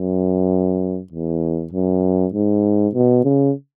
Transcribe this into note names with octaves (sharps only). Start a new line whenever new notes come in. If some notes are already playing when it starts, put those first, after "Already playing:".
Already playing: F#2
E2
F#2
G#2
B2
C#3